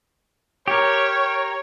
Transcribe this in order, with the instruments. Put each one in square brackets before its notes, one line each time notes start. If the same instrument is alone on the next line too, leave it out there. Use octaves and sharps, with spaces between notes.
[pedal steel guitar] G4 A#4 [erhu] C#5